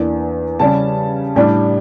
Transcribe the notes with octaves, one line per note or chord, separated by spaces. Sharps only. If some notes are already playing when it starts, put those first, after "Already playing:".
Already playing: E2 E3 A#3 D4
C#3 G3 C#4 A5
A2 G3 D4